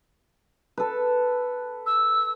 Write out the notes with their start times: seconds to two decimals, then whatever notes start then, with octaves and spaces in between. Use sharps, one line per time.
0.78 A4 B4
1.86 E6